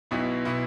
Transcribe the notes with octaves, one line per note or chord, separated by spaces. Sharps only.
B1 B2 B3 E4
B2 B3 E4